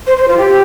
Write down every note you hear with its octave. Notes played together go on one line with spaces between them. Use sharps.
C5
C5
F4
G4